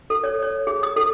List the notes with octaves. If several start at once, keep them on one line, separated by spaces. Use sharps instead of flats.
A4
C#5
C#5
G#4
D#6
A4